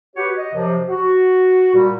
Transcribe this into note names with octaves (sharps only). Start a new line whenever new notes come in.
F#4 G4 B4 C#5
D#5
F#2 C3 F3
F#4
A#2 G3